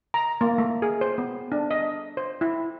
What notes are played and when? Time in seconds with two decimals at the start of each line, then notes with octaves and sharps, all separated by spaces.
0.14 A#5
0.41 A#3
0.58 A3
0.82 G#4
1.01 C5
1.18 B3
1.52 D4
1.71 D#5
2.17 C5
2.41 E4